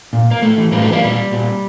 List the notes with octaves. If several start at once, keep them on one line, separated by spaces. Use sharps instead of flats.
A#2
A#3
A2 A3
E3
A2 G3 A#3
A3 C4
E3
G3 A#3
A#2 G3
A#2